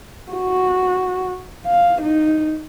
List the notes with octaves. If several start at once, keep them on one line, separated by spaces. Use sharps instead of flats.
F#4
F5
D#4